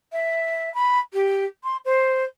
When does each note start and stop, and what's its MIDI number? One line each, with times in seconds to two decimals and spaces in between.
0.13 0.73 76
0.74 0.99 83
1.13 1.45 67
1.64 1.77 84
1.85 2.24 72